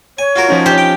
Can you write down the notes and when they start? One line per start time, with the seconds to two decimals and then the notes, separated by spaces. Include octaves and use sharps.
0.19 C#5 G#5
0.36 F4 F#4 A#4
0.48 F3 C#4 D#4
0.66 G4 C5
0.78 G5